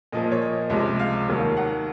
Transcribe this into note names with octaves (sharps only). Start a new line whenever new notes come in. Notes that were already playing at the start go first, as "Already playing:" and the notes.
A#2 F3 A#3 D#5
D#5
C#5
D#5
C#2 C3 F3 G#3
F5
D#2 D#3 F#3 A#3
F#5